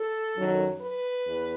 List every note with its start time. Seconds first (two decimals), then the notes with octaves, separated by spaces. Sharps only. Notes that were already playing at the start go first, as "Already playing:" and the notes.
Already playing: A4
0.36 F#2 D#3 F#3
0.82 B4
1.26 E2